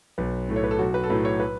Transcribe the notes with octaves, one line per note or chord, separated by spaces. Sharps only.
B1 B4
A2 A3
C#5
B4
A4
B1 F#4
B4
A4
A2 F#3 A3 B4
C#5
B4